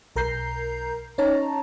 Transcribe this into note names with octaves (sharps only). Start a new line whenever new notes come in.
B1 A#4 A#5 G6 C7
C#4 D#4 C#5 A5 A#5